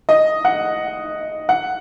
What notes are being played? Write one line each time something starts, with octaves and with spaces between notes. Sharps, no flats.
D#5
F#5
F#5